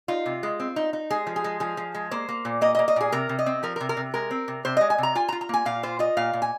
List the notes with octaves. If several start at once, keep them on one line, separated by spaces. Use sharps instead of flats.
D#4 F4
C3
G#3
C4
D#4
D#4
G#3 G#4
F3
G#4
G#3
F3 G#4
F3
G#3
A#3 C5
A#3
A#2
A#3 D#5
D#5
A#3
D#5
A#2 G#4
C3 A#4
C3
D#5
C4
F3 A#4
A#4
C3
A#4
C3
G#3 A#4
C4
C3
C3 C5
G#3 D#5
G#5
C3 A#5
F4 G#5
A#5
F4
A#5
A#3 G#5
A#2 F5
F4 C5
F4 D#5
A#2 F5
A#2
G#5